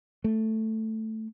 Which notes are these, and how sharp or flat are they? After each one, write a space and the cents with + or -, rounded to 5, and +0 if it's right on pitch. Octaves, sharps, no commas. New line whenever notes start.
A3 +5